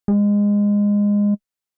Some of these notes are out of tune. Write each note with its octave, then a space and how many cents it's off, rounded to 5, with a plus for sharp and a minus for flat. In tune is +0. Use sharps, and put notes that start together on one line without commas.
G#3 -20